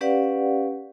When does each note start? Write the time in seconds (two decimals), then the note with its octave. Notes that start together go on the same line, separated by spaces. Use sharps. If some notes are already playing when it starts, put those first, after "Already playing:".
0.01 C#4 G4 B4 D5 F5 F#5